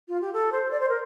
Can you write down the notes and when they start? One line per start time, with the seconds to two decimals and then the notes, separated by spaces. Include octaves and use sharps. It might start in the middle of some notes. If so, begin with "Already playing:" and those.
0.08 F4
0.21 G4
0.33 A4
0.52 C5
0.71 D5
0.80 C5
0.89 A#4